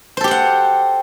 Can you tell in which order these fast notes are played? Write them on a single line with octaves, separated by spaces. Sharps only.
C5 A4 G4 G5 F#5